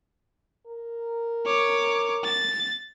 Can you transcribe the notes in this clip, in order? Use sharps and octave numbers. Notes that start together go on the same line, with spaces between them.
A#4
C#5 D6
A6